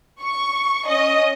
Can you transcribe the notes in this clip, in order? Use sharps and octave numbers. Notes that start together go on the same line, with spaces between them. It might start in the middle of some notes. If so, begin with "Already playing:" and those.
C#6
C#4 D#5